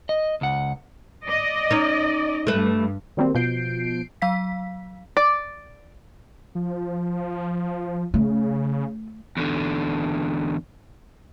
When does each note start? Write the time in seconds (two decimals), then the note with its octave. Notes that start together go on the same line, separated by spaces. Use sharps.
0.09 D#5
0.41 C#2 F#5
1.25 D5 D#5
1.71 C#4 D#4
2.47 G2 A3 B4
3.17 D#3 F#3 G3 A#3 C4
3.35 B2 F3 G6 C7 D7
4.22 F#3 F5 B6
5.17 D5
6.55 F3
8.14 C#3 A3
9.37 E2 D3